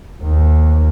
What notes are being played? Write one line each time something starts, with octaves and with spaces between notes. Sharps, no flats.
D#2